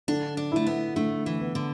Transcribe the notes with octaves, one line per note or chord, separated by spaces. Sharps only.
D3 D4
D4
A3 E4
B3
D3 A3
E3
B3
D3